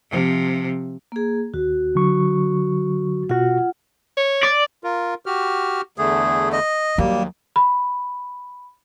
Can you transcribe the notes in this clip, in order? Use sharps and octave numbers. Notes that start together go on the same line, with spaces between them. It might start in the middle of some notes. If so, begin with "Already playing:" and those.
C3 F3
A#3 G#4
D#2 F#4
D3 F#3 C#6
B2 F4 F#4 F#5
C#5
D5
F4 A#4
F#4 G4 F6
E2 D3 A3 G#4
D#5
D#2 F#3 G3 A#3
B5